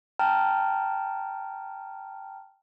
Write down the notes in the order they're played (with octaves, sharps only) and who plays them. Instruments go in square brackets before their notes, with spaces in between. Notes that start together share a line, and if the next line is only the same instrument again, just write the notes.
[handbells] G5 A5 A#5 F6